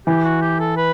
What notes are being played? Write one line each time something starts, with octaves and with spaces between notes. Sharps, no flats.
E3 G4
F#4
G4
A4
B4